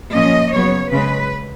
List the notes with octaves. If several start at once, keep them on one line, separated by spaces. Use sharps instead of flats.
A#2 F3 A#3 C#4 D#5
F#2 C#3 F#3 B3 C#5
C#3 G#3 C#4 B4